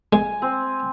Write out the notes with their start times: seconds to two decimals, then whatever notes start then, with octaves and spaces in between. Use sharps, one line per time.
0.13 G#3 G#5
0.42 C4